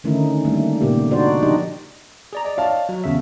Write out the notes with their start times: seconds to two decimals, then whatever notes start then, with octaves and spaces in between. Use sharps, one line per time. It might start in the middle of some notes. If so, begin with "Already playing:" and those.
0.04 D3 D#3 A3 C#4 D#4 E4
0.45 G3 A3 A#3 D4
0.81 A#2 C#3 A#3 B3 G4
0.96 A#3
1.11 D4 D#4 F#4 C5 D5
1.42 F3 D4 D#4 G4 D#5
2.33 G#4 D5 A#5
2.45 D5 D#5
2.57 C#5 F5 A5
2.89 F#3
3.04 E2 C#3 E5